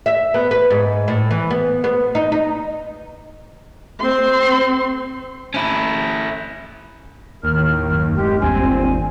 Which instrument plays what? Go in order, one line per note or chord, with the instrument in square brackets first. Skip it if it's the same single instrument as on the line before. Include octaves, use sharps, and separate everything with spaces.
[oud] E5
B3
B4
G#2
A2
E3
B3
B3
D#4
D#4
[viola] C4 C6
[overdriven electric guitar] C#4 E4
[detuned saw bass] D#2 [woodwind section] A2 A#4 F6
[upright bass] F#2
[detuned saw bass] D1 [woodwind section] G#3 G4
[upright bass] G1 D#2 [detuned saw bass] C4 [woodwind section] G#5